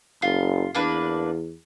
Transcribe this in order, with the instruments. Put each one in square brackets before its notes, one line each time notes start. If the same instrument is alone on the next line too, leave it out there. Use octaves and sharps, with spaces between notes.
[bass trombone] F#1 [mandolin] F4
[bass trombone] E2 [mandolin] A#3 D4 B4